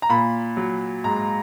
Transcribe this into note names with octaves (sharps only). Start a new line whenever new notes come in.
A#5
A#2 B5
F#3
G#2 A#5